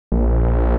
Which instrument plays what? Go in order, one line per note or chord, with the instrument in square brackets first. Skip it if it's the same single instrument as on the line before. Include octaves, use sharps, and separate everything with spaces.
[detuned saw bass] A#1